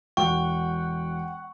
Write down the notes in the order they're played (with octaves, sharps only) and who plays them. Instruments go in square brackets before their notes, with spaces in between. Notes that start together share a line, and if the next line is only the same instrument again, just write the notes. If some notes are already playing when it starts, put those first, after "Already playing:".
[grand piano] E1 [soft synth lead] F#5 [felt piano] G5 [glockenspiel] C#6